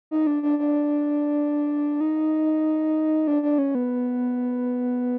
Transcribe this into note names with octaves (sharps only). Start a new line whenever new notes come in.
D#4
D4
D4
D4
D#4
D4
D4
C#4
B3